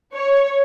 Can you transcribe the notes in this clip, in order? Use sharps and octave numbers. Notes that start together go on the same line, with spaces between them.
C#5